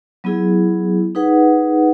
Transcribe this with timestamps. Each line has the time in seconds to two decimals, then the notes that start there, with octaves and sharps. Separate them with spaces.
0.24 F#3 B3 E4 G#4
1.15 D#4 G#4 B4 F#5